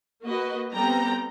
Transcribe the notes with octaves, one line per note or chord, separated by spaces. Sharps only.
A#3 F#4 B4 D#5
G3 B3 C4 A4 G5 A#5